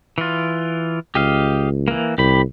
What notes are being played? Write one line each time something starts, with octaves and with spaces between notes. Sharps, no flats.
E3 F4
C#2 G4 D#5 F5
E3 A#3
C2 G4 B5